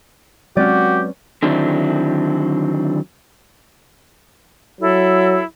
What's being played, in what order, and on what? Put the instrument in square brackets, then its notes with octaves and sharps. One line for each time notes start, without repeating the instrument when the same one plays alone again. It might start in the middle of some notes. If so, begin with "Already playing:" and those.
[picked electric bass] F#3 G#3 C4 [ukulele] C#4 B4 D5 [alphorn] F#4 [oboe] G4
[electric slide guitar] D3 D#3 F#3 C4 D4 E4
[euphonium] F#3 [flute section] E4 A4